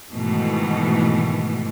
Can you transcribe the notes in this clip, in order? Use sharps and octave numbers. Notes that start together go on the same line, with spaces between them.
G#2 B2 D#3 E3 A3